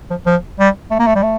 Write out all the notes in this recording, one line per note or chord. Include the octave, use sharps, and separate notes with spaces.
F3
F3
G3
A3
A#3
A3
G3
A3